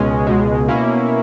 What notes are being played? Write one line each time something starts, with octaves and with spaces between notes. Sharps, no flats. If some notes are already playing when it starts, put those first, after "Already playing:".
Already playing: C#2 B2 G#3 C#4
C#2 B2 G#3
B2 A#3 C#4 E4